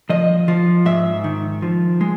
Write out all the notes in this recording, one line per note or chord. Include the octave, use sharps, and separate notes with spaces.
F3 D#5
F3
G#2 E5
D#3
F3
G#3